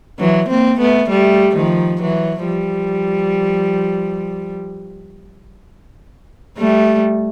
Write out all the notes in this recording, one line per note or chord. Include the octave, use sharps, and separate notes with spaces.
E3 F#3
A#3 C4
A3 B3
G3 A3
D#3 F3
E3 F#3
F3 G3
G3 A3